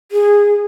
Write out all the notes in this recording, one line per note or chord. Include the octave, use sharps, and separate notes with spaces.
G#4